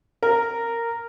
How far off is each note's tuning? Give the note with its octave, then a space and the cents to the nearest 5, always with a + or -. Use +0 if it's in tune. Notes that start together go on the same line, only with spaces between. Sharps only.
A#4 -10